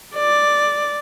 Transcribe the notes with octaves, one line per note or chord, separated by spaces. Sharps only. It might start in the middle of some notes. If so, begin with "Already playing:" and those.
D5